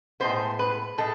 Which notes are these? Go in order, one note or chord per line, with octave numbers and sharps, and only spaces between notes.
A2 G#3 B3 C5
B4
A2 G#3 A4